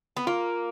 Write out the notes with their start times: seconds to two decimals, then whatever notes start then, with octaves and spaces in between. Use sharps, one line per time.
0.17 B3
0.27 A#3 F4